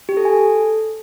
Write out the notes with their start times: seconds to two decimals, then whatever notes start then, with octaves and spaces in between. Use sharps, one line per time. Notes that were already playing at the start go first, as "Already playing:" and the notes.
0.09 G4
0.17 A4
0.25 G#5
0.33 A4